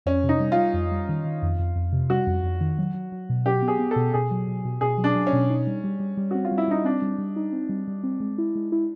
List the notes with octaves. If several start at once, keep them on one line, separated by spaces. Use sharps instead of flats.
F2 C#4
C3
D#4
G3
G3 F4
F2
G3
D#3
D#3
F2
F2
F2
C3
G3 F#4
F2
F2
D#3
F#3
F#3
F#3
B2
F#3 G4
B3
G#4
B3
A4
B2
B2 G#4
F#3
B2
B2
B2 G#4
F#3
D4
F#3
C#4
B2
D#4
G3
G3
G3
G3
C4 F#4
F4
G3
E4
G3 D#4
C4 D4
G3
G3
D#4
C4
G3
G3
C4
G#3
E4
G#3
E4